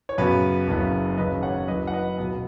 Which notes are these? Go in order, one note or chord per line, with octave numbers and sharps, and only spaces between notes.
C#5
F#2 C#3 B3 F#4 B4
F#1 F#2 C#3 B3
G#1 F#2 C#3 B4 D#5
C#5 F#5
F#1 F#2 F#3 B4 D#5
F#5
B4 D#5
C#2 B2 B3